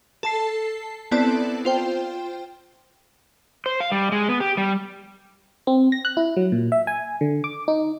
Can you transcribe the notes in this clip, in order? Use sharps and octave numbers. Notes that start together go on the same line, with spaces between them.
A4 A5 C7
B3 C4 E4 A4 D5 A5
F4 C5 G5
C5
F5
G3
G#3
B3
G4
G3
C4
A#6
F#6
E4
F#3
A#2
E5
G#5
D3
D6
D#4